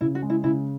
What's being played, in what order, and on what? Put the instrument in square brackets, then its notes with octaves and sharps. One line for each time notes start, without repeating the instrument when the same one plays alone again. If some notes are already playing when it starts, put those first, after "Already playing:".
[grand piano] C#3 [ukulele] E4
[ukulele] F#4
[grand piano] G#3
[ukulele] E4
[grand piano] C#3 [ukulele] E4